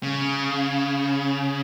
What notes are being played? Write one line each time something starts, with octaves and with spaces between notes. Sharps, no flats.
C#3